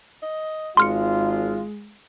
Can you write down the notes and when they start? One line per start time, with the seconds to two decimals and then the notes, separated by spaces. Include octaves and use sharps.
0.22 D#5
0.77 G#1 G#3 F4 C6 F6 C#7